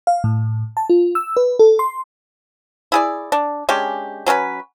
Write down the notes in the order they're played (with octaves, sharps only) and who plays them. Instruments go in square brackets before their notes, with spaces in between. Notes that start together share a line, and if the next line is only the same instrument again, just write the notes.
[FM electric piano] F5
A2
A5
F4
E6
B4
A4
C6
[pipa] E4 G#4 D5
D4
G#3 C#4 D4 G4
F#3 C#4 A4 B4